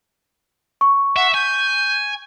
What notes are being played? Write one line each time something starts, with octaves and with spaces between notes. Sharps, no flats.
C#6
E5 F#5
G#5 G6